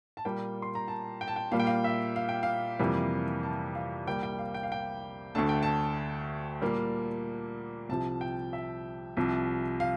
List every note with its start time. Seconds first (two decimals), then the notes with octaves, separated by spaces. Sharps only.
0.17 A5
0.25 A#2 G3 A#3 G5
0.62 C6
0.75 A#5
0.88 A5
1.21 G5
1.28 A5
1.36 G5
1.52 A#2 G3 A#3 F5
1.60 G5
1.67 F5
1.84 E5
2.16 F5
2.29 G5
2.43 F5
2.79 F2 C3 E3 G3 A#3
3.43 A5
3.75 F5
4.07 C2 C3 G3 A#3 G5
4.23 G5
4.39 F5
4.54 G5
4.63 F5
4.72 G5
5.35 D2 D3 A3 A5
5.49 G5
5.63 A5
6.62 A#2 G3 A#3
7.89 C2 C3 F3 A5
8.21 G5
8.53 E5
9.17 C2 C3 F3
9.80 F5